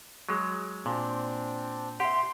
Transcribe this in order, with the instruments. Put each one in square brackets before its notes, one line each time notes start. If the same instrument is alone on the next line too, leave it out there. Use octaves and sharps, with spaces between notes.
[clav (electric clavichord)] F#3 G#3
[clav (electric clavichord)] A#2 [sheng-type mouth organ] C4 D4
[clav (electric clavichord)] G4 [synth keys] E5 F#5 [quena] C6